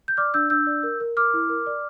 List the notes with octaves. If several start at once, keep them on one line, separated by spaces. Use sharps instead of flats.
G6
D5 D6 F6
D4 E6 G6
D4 E6 G6
D5
A#4
A#4
A#4 D6 F6
E4
A#4
D5